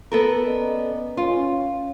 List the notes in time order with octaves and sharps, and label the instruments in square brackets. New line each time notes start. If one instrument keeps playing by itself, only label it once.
[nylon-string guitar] B3 A4 A#4
[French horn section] C#4 D5 D#5
[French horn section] C#4 [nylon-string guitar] F4